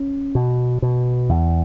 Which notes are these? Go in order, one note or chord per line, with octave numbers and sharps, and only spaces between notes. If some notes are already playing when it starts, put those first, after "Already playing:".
Already playing: C#4
B2
B2
E2